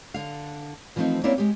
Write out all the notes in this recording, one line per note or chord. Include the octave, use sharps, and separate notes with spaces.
D3 F5
E3 F3 A3 A#3 C4 D#4
A#3 C4 C#4 E4 C#5 D5
G#3 G4